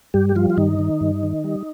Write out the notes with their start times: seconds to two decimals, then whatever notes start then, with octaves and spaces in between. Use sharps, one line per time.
0.14 G2 G3 G4
0.29 G4
0.36 F3 G3 F4
0.50 F4
0.57 G2 D#3 D#4
0.79 D#3
1.01 G2
1.23 D#3
1.44 G3